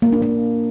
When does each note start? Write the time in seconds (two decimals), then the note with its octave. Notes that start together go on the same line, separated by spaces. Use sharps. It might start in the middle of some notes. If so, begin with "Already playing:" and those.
0.02 A#3
0.12 D4
0.22 A#3